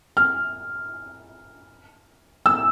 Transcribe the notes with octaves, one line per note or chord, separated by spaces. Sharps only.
F6
E6